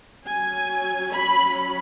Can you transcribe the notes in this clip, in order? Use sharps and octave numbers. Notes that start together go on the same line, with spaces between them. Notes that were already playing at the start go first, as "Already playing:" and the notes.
F#3 C#4 G#5
B5